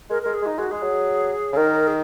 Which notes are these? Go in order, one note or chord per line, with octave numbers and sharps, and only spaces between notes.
G#3 A#4
G#3 A#4
G#4
G#3
D#4
G#3 F#4
G#3 G#4
F#3
C#3
D#3 A#4
G#4